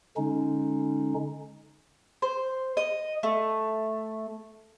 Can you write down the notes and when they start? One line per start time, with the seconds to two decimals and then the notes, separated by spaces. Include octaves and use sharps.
0.17 D3 G#3 C#4 D#4
2.22 C5
2.77 D#5
3.23 A3